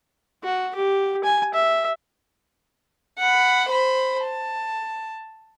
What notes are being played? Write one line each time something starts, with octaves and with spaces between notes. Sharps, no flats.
F#4
G4
G#5
E5
F#5 B5
C5 B5
A5